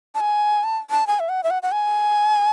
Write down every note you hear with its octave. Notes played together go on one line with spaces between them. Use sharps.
A5
G#5
A5
A5
G#5
E5
F#5
E5
F#5
F#5
G#5